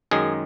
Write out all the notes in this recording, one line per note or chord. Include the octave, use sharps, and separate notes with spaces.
F#2 D#3 G#3 G#4